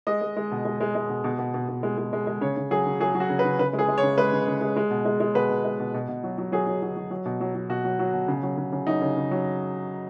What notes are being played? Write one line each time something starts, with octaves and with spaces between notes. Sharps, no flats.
G#3 D#5
G#3
G#3
B2
G#3
G#3
G#3
B2
B2
B2
B2
B2
G#3
G#3
G#3
G#3
C#3 C#5
C#3
F#3 G#4
C#3
F#3 G#4
F#3
F#4
C#3
B4
C#3
C#3 B4
G#3
G#4
G#3
C#5
C#3
G#3 B4
C#3
C#3
G#3
G#3
B2
G#3
G#3
B2 B4
B2
G#3
B2
B2
B2
F#3
F#3
F#3 G#4
F#3
F#3
F#3
F#3
B2
F#3
F#3
B2 F#4
F#3
F#3
B2
C#3
F#3
C#3
C#3
F#3 D#4
C#3
C#3
F#3